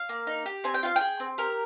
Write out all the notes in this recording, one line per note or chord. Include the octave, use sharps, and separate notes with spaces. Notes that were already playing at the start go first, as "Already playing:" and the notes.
Already playing: F5
A#3
D#4
G4
C4 G#5
G5
F4 F5
G5
G#4
C4
G4 A#4